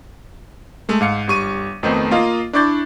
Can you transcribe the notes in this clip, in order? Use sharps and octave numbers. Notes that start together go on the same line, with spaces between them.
G#3 A3
G#2 F5 C#7
G1 G3 C#6 D#7
F2 D#3 A3 B3 D#4 C5
A#3 F4 D#5 F5
D4 E4 D5 C#6 G6 A6